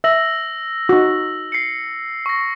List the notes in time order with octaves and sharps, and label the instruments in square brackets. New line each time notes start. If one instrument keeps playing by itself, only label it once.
[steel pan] E5 [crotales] E6 A#6 F#7
[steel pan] D#4 F#4
[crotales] C7 C#7
C#6 A#6